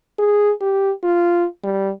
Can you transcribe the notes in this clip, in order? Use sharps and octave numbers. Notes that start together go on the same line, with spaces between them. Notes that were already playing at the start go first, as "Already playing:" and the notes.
G#4
G4
F4
G3